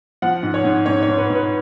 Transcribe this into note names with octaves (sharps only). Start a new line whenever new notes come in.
F3 F#5
G#2
C#5
G#2
G#2 C#5
C#5
G#2
B4
G#2
B4